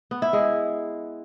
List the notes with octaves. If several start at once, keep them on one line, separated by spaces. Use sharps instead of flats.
B3
E4
G#3